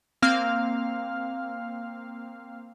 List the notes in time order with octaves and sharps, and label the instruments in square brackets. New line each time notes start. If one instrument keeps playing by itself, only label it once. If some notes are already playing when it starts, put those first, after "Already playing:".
[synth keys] A#3 C4 F5 F6